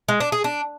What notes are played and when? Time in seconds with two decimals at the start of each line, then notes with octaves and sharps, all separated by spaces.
0.08 G#3
0.20 D4
0.32 G#4
0.44 D4